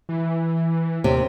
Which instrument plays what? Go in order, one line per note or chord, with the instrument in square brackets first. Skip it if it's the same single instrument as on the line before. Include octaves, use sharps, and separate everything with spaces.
[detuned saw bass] E3
[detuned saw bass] D#2 [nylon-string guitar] C3